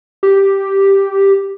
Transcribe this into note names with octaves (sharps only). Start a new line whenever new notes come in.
G4